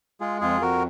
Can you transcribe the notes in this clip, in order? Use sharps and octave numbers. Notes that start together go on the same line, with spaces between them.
G#3 F4 G#4
F2 F4 G#4
F2 F#4 A#4